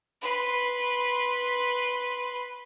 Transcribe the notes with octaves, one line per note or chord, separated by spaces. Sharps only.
B4 C6